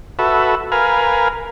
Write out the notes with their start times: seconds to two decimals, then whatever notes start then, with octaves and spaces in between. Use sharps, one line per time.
0.19 F#4 A4 B4 E5
0.72 A#4 B4 F5 G#5